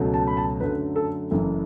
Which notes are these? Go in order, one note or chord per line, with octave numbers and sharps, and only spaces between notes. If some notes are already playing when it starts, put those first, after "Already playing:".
Already playing: C#2 B2 F#3 A3
A5
B5
A5
F#2 D3 F#3 A3 B4
A4
F#1 F#2 E3 A3